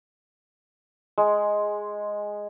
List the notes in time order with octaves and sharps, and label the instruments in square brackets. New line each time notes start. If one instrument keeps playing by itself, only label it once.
[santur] G#3